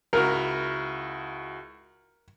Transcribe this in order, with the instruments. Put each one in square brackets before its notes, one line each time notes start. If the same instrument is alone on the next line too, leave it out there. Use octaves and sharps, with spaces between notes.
[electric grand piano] C#2 E4 F#4 [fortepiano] A#4